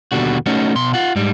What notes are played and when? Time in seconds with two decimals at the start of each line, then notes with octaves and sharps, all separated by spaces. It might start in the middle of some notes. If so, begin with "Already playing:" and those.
0.12 D#2 B2 D3 G3 F#4
0.46 A3 C#4 D#4 F#4
0.75 B2 C6
0.94 F4 F#5
1.16 G#2 G3